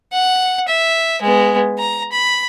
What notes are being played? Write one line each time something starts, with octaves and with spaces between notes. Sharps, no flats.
F#5
E5
G#3 B3
A#5
B5